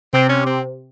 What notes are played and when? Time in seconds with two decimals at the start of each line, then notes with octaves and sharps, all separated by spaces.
0.13 C3 C4
0.29 C#4
0.46 C4